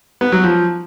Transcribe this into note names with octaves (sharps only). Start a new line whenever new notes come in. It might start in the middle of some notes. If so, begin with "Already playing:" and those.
B3
F#3
F3